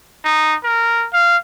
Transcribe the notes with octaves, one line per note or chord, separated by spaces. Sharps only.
D#4
A#4
F5